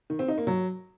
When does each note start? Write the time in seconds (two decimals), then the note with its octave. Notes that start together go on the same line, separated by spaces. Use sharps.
0.10 D#3
0.19 C4
0.28 D#4
0.38 A#3
0.47 F#3